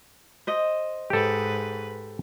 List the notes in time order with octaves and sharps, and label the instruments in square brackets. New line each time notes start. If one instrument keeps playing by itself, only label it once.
[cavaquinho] C5 D#5
[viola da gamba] G#2 B4 [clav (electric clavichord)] G4 A4